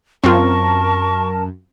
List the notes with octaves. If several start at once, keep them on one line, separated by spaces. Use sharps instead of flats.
F#2 C4 F4 A#4 A5 C#6